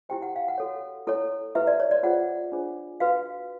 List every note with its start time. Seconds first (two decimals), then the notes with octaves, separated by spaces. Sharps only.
0.09 E4 G4 C5 G5
0.22 F#5
0.36 F5
0.48 F#5
0.58 F#4 A4 C#5
1.07 E4 A4 C#5
1.55 E4 G4 B4 E5
1.67 D5
1.80 C#5
1.91 D5
2.03 F4 G#4 C5 F#5
2.52 D4 F4 G#4 C5
3.00 F#4 B4 F5